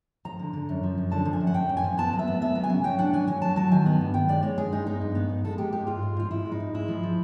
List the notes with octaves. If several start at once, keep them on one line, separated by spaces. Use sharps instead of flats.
F3 A#5
D3
D3
F#2
F3
F#2
D3 A5
F3
G#5
F#2
F#5
F#2 G5
F#2
G#5
F3
B3 A5
F#3
E5
B3
B3 E5
F#3
G#5
C#3
F#3 G5
D4 F#5
F#3 G#5
F#3 G#5
F#3 A5
F#3 A5
D#3 G#5
B3
G2
D#3 G5
G#3 D5
G#3 C#5
G2 G#4
G#3 D#4
B3 D#4
G2
B3
B3
G#3 A4
G#3 G4
G#3 G4
G#2 F4
G#2
G#2 F4
F3 E4
G#3
D#4
G#2
G#3 E4
F3
F3